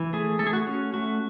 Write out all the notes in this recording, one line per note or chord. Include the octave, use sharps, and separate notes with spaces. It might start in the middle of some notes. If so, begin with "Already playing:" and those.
Already playing: E3
A3 G#4
A3 A4
G#4
F#4
C#4
A3 F#4